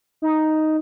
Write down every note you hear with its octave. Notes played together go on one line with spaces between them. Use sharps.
D#4